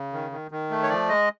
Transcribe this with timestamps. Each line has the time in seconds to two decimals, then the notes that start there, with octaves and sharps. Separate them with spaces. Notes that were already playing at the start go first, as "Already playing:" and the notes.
Already playing: C#3
0.13 D#3
0.32 D#3
0.51 D#3
0.70 A3
0.83 C#5
0.89 F3 D5
1.09 G#3 D#5